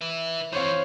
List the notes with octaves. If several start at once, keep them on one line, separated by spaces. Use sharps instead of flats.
B4 E5
E3 C4 C5 C#5 F5